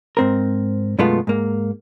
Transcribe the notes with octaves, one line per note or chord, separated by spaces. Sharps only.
G#2 C4 A#4
F#2 B2 G#3 A3 B3 F4
G#2 A#3